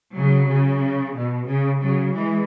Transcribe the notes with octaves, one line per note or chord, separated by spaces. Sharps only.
C#3 F#3
C#3
B2
C#3
C#3 F#3
E3 G#3